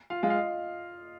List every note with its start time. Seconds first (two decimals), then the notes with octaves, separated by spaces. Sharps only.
0.10 F4 F5
0.23 G#3 F4
0.30 F5
0.35 D#5